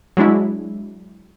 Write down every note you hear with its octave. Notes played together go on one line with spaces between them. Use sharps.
F#3 G#3 D4 E4